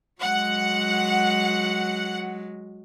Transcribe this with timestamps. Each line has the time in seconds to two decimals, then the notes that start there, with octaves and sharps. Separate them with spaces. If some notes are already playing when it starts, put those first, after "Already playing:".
0.22 F#3 G#3 F#5